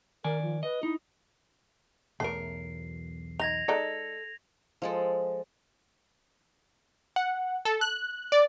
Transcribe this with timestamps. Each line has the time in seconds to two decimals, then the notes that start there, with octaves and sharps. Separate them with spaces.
0.24 D#3 A#4 D5 G#5
0.42 F3
0.63 B4 D#5
0.83 D#4 E4
2.20 B1 E2 A3 A#4 C7
3.40 D#4 G#6 A#6 F7
3.68 G#3 D#4 A4 D5
4.82 F3 G#3 A4
7.16 F#5
7.65 A4
7.81 F#6
8.32 D5